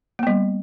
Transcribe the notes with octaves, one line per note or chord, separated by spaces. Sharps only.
G3 A#3 B3